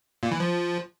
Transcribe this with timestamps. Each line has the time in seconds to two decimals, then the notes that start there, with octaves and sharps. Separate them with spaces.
0.23 A#2
0.31 E3
0.40 F3